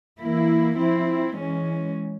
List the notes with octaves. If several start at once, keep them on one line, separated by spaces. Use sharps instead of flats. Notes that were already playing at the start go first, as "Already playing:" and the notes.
E3 A#3 E4
F3 C4 E4
E3 G#3 C#4